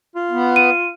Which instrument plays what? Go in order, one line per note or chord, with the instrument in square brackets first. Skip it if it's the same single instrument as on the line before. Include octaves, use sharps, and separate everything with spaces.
[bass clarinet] F4
[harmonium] B3
[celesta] D#7